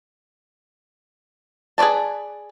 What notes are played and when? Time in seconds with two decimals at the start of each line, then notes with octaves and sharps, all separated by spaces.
1.78 G#4 B4 C#5 D5 A5